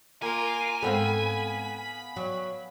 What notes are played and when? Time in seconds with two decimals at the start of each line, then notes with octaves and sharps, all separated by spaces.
0.22 A#3 F4 A#4 G#5
0.83 G#2 B3 C4 A4 F5 B5
2.16 F#3